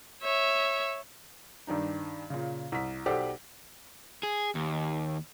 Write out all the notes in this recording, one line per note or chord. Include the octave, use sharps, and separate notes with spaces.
C#5 E5
G2 D#3 D4 D#4
A#2 C#3
C2 B6
B1 G4 A4 C5 D5 F#5
G#4
D#2